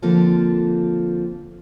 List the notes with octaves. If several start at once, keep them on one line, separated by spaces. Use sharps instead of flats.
D3 F3 A#3 C4 F4 A4